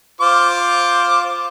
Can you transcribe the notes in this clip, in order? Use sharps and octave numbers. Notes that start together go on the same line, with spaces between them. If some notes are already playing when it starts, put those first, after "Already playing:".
F4 C5 D6